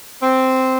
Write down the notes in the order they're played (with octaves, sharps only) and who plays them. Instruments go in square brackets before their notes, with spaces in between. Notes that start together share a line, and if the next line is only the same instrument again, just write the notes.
[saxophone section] C4